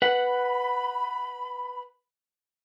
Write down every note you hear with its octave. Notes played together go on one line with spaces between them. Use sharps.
B4 F#5 B5